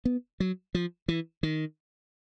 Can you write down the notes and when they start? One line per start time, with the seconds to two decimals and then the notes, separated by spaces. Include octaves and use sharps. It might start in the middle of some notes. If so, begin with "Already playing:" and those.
0.05 B3
0.40 F#3
0.75 F3
1.08 E3
1.43 D#3